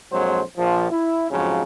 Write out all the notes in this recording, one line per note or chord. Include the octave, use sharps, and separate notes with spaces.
A#1 F2 F#3 G#3 C5
A#1 F3
E4
F2 G#2 C#3 F3 F#3